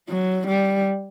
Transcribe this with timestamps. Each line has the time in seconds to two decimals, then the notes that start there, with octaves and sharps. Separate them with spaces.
0.09 F#3
0.47 G3